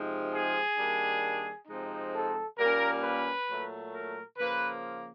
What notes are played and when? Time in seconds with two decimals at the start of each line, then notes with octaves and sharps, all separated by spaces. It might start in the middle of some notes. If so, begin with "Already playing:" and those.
Already playing: C3 F3 G#3 C4 D#4
0.34 G#4
0.78 D#3 G3 A#3 D4
1.68 C3 F3 G#3 C4 D#4
2.13 A4
2.57 A#2 G3 A#3 C#4 A#4
3.03 B4
3.47 A#2 F#3 A3
3.92 A#4
4.38 C#3 F3 A#3 B4